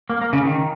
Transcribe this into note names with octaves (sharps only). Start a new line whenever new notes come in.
A#3
A#3
C#3
D#3